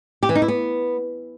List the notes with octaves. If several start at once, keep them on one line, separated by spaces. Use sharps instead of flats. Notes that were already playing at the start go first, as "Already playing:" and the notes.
G4
E3
D#4
E4
B3